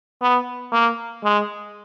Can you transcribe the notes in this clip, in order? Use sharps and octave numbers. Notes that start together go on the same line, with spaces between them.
B3
A#3
G#3